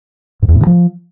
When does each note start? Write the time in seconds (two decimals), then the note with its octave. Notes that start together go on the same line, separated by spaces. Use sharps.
0.42 G#2
0.48 E2
0.55 A2
0.61 D3
0.67 F3